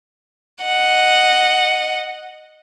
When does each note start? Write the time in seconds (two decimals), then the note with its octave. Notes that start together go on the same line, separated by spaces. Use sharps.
0.62 D#5 F#5